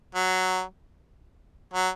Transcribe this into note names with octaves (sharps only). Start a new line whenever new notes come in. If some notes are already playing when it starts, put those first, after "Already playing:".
F#3
F#3